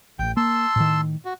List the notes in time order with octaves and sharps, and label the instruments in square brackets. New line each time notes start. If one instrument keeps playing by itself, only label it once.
[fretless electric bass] A1 [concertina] G5
[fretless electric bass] A#3 [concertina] A5 C6 E6
[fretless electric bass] A2 D#3
[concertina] F#4